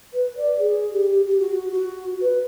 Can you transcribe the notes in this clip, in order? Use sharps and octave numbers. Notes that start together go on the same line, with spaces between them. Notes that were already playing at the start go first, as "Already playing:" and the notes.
B4
D5
G#4
G4
G4
F#4
F#4
B4